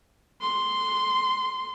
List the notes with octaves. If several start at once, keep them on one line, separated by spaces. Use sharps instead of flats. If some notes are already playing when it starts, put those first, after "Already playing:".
C6